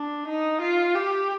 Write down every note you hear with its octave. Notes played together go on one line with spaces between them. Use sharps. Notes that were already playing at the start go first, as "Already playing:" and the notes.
Already playing: D4
D#4
F4
G4